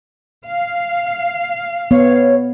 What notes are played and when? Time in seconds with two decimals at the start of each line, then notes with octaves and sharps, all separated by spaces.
0.45 F5
1.91 B3 C#5